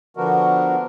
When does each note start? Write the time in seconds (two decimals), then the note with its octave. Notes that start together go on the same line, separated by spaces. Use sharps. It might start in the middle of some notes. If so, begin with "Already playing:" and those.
0.17 D3 F3 B3 D4 F#4 A#4